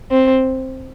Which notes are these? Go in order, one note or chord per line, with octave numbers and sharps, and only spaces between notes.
C4